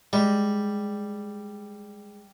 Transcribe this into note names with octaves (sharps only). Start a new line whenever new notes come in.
G3 G#3